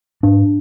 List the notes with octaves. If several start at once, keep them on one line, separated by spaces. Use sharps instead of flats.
G#2 D4